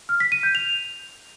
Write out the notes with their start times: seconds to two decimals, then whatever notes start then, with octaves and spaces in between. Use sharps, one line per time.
0.09 F6
0.20 B6
0.32 D#7
0.43 G6
0.55 F7